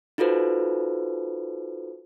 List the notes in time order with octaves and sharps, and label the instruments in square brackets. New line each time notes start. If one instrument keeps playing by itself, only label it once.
[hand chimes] D#4 F4 F#4 A4 B4 C5